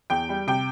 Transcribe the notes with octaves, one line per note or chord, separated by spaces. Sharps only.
E2 G5
G3
C3 G5